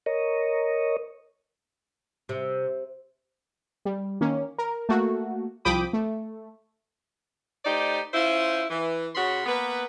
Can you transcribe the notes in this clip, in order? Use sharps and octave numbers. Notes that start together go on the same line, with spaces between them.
A#4 C#5 D#5
C3
G3
D#3 A#3 C#4
A#4
A3 A#3 F#4
C2 F3 G5 B5 D6 D#6
A3
A3 D#4 G4 C5 D5
C#4 E4 F4 C5
E3
C#3 F#4 C#5 B5 C6
A#3 B3 B4